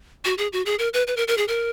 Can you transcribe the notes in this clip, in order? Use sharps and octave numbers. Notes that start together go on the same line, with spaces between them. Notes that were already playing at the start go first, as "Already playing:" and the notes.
F#4
G#4
F#4
G#4
A#4
B4
B4
A#4
A#4
G#4
A#4